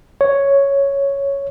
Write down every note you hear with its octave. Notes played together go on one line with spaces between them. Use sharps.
C#5